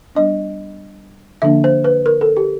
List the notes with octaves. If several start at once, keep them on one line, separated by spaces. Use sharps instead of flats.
G3 B3 D4 D#5
D3 F3 A#3 D4 E5
C5
B4
A#4
A4
G4